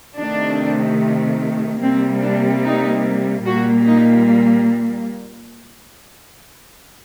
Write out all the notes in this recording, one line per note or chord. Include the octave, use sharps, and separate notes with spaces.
C3 D#3 A3 D4
C3 G3 A#3 C4
D4
D#4
A#2 G3 A#3 F#4
D#4